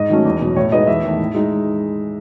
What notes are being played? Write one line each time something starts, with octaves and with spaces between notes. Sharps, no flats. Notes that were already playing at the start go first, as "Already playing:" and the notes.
Already playing: G#2 D#5
D#3 F#3 A3 C#4
E2
B2 F#3
A2 C#5
G#3 B3 D#4 D#5
E2 E5
D#3 A3
A2
G#3 D#4